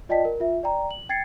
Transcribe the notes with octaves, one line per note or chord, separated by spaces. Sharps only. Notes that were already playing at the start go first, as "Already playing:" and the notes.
F4 D5 D#5 G5 A5 B6
A#4
F4 E5
D5 G5 A#5
F#7
G5 G#6 A6 C7 C#7